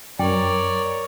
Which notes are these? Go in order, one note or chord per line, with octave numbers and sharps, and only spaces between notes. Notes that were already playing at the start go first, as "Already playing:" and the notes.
F#2 A#4 C#5 D5 G5